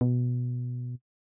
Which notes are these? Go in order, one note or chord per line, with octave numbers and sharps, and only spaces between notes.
B2